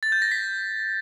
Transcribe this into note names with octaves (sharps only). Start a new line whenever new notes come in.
A6
G6
A#6
B6